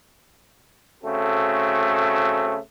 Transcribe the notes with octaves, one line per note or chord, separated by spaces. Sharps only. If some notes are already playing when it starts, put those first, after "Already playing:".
C#3 A3 C4 F#4 A4